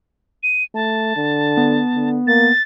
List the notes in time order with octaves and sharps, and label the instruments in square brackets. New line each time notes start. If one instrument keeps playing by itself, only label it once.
[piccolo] D#7
[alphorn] A3 [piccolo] A5
[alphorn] D3
[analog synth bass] B3
[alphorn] D3
[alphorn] A#3 [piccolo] A6